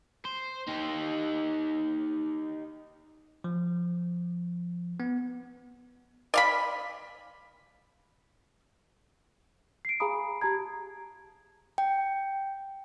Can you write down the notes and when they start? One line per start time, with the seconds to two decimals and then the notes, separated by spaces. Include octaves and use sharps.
0.25 C5
0.68 D#4 G4
3.44 F3
5.00 B3
6.34 D5 F5 B5
9.85 C7 D7
10.00 G#4 F5 G#5 A#5 B5 D#6
10.41 G4 A5 A#5 G#6
11.78 G5